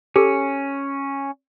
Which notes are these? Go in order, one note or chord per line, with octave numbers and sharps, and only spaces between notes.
C#4 G4 A4